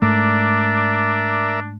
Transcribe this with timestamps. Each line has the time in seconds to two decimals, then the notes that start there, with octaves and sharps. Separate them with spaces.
0.02 G#2 A3 D4 A#4 D5 E5